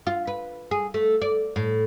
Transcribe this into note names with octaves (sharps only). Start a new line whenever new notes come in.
F4
B4
G#4
A3
D5
A2